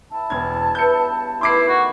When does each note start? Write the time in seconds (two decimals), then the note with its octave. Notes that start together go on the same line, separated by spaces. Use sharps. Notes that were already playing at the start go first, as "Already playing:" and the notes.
0.11 E4 A5
0.30 E1 C#4 G#4 G#6
0.75 G2 B3 E5 G6 C#7
1.41 D#3 E3 A3 E4 C6 D6 C7
1.68 F#4